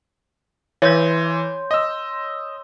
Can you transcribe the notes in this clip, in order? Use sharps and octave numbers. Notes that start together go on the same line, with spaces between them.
E3 C#5 C6 G6
D#5 E6